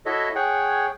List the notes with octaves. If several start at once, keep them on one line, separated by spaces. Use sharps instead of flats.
E4 F#4 A4 C#5 D#5 E5
G#4 C#5 F#5 G5